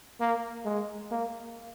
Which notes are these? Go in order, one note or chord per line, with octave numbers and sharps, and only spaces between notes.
A#3
G#3
A#3